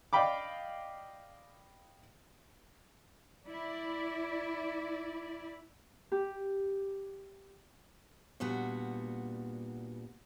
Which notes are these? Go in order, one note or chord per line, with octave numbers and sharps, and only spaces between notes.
D5 D#5 F5 G5 B5 D6
E4 D5
G4
A#2 G3 B3 D4 F#4